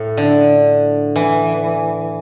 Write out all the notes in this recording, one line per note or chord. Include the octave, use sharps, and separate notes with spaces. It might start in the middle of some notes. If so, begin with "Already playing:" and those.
Already playing: A2
D3
E3